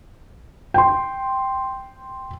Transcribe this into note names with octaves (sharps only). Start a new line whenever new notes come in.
G5 C6